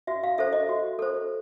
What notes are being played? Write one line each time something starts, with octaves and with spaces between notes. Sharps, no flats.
F#4 E5
F5
A4 C5 E5
D#5
F#4
A4 C5